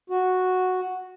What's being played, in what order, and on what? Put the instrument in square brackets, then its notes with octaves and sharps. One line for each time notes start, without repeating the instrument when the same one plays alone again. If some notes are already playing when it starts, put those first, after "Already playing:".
[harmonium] F#4